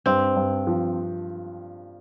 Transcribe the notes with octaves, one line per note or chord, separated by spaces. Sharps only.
G2 C4
G2
F3